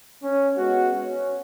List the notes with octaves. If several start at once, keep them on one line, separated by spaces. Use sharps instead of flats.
C#4
G#3 B3 F#4
C#4